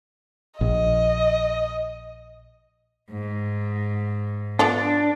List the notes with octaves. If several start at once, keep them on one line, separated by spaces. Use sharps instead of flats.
A#1 D#5
G#2
B3 D4 F4 A4